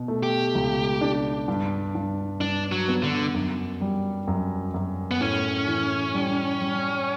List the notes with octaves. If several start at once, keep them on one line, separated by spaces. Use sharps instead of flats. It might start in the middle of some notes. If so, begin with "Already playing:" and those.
Already playing: B2
A3
G4
C#2
D4
G2
G2
G2 D4
F#3
B3
D3
F#2
G3
F#2
F#2
B3
A2 C#4
E3
G3
G3